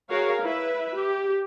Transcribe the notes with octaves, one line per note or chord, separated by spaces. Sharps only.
F#4 G#4 A#4 C#5 F5
E4 B4 E5
G4